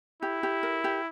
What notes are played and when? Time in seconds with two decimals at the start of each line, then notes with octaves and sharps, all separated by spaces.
0.22 E4 G4
0.43 G4
0.63 A#4
0.84 G4